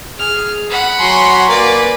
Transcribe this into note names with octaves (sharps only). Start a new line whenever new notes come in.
G#4 F6
F#5 B5
F#3 G#5 C6
A#3 B4 D5 G#5